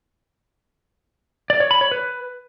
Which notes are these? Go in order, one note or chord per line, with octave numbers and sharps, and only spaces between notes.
D5
C#5
B5
C#5
B4